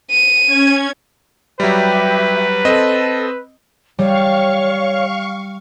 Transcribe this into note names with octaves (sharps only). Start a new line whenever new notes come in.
D#7
C#4 G#6
F#3 G3 G4 B4 E5
C4 A4 D#5
G3 C#5 F5 C#6